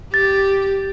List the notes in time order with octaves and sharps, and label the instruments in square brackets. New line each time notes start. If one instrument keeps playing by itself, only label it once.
[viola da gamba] G4 [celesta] A6